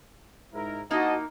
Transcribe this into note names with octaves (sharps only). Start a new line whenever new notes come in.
G#2 E4 A#4
A#3 D#4 E4 F#4 D#5 A5